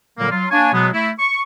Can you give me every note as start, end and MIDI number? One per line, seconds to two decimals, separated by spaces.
0.18 0.30 46
0.18 0.30 50
0.18 0.30 54
0.18 0.30 55
0.18 0.30 58
0.31 0.45 54
0.31 0.45 65
0.50 0.71 58
0.50 0.71 62
0.50 0.71 73
0.50 0.71 80
0.73 0.87 47
0.73 0.87 54
0.73 0.87 56
0.73 0.87 59
0.93 1.10 57
0.93 1.10 64
1.19 1.41 85